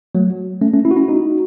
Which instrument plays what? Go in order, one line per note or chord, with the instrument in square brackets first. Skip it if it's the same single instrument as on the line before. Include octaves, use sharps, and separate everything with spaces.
[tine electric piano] F#3 A3
A3 C#4
A3 C#4
C#4 E4
F#4
C#4 E4
D#4 F#4